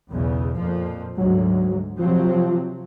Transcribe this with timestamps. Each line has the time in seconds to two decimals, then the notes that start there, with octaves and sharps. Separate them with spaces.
0.10 B1 E2 C#3
0.57 F2 A#2 F3
1.17 D2 G#2 F#3
1.99 C3 F3 F#3 C4